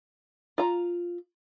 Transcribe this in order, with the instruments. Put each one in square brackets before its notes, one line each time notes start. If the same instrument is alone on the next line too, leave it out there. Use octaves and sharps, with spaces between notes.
[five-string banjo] F4 A#5